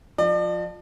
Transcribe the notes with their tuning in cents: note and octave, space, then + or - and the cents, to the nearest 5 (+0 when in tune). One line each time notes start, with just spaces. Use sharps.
F3 +20 D5 +40